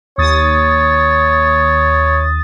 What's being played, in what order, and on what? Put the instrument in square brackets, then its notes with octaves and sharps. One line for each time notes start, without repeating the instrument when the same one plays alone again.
[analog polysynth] D#2 D#6 A6 [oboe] C#5